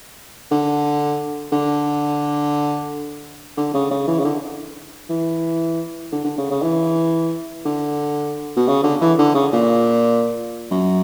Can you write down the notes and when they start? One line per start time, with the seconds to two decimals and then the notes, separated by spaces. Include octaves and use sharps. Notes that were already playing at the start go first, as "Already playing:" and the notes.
0.51 D3
1.52 D3
3.57 D3
3.74 C#3
3.90 C#3
4.07 E3
4.20 C#3
4.24 D3
5.09 E3
6.12 D3
6.25 D3
6.38 C#3
6.51 C#3
6.63 E3
7.65 D3
8.56 B2
8.67 C#3
8.84 D3
9.01 E3
9.19 D3
9.34 C#3
9.53 A#2
10.71 F#2